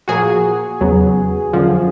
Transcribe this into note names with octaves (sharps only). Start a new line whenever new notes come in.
A#2 F3 A#3 F#4 G#4
E2 C#3 F#3 B3
F#2 D3 F3